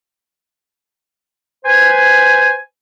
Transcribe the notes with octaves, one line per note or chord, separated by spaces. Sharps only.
B4 C5 G#5